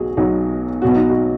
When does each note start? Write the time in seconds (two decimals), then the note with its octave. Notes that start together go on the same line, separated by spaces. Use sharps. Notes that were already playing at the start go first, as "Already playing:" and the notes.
Already playing: B1 B2 F#3 F#4 G#4
0.17 B1 B2 F#3 D#4
0.82 B1 B2 F#3 F#4
0.95 D#4
1.09 F#4